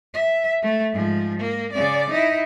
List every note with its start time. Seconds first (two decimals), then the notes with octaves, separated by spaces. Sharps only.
0.13 E5
0.62 A3
0.92 G#2 F3
1.39 A#3
1.73 C#3 D5
2.10 D#4 E4